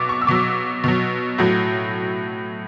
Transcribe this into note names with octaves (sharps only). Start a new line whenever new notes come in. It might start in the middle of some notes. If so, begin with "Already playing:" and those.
Already playing: B2 F#3 D6
C#6
E6
B2 F#3 D6
B2 F#3
A2 F#3